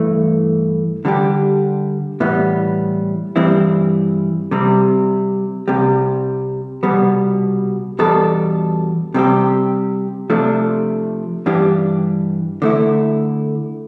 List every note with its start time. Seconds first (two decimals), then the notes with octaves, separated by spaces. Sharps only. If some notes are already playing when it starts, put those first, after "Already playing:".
Already playing: G2 E3 A3
1.05 D3 G3 D4 G4
2.20 A2 E3 G3 B3
3.36 G2 E3 G3 C4 E4
4.51 C3 G3 C4
5.68 C2 C3 G3
6.83 C2 B2 G3 B3
7.99 E2 B2 G3 D4 A4
9.14 C3 G3 C4 G4
10.30 C3 F3 A3 D4
11.46 G2 E3 G3 D4 G4
12.62 D3 A3 E4